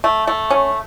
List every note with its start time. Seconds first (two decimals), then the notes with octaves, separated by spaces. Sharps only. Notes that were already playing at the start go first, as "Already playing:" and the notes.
0.04 A3
0.27 A3
0.50 C#4